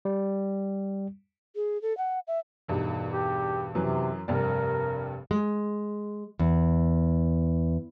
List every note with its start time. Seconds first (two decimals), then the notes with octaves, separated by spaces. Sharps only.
0.05 G3
1.56 G#4
1.82 A4
1.98 F#5
2.28 E5
2.68 E1 G2 D#4
3.10 G4
3.75 F#2 C3 E3 F#3
4.28 F1 G2 G3 A#4
5.31 G#3
6.39 E2